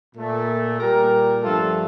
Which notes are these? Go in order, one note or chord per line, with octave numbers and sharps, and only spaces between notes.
A#2 A3
A#2 G3 G4 A#4
G2 F3 A3 F4 A4